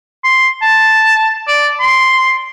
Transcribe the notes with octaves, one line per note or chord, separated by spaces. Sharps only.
C6
A5
D5
C6